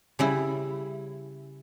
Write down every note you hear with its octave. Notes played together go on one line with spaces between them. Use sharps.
C#3 G3 E4